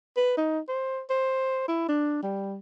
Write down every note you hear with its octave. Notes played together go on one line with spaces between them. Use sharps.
B4
D#4
C5
C5
E4
D4
G3